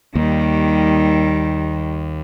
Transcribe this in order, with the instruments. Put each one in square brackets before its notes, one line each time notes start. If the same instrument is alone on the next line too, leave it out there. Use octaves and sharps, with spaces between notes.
[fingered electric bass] D#2 [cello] D#3 G3